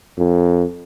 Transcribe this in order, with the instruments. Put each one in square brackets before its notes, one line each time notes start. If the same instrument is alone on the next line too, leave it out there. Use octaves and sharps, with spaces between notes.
[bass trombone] F2